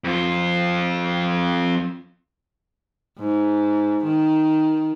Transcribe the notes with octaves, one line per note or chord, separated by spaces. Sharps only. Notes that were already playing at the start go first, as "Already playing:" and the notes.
F2 F4
G#2
D#3